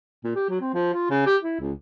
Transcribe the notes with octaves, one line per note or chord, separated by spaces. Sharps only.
A#2
G4
F#3
C4
F3
F4
C#3
G4
E4
C#2